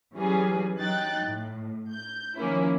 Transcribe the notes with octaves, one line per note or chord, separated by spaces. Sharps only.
E3 F#3 G3 C#4 G#4 B4
F#3 D#4 G5 F#6 A6
A2
G6
D#3 F3 A#3 C#4 E4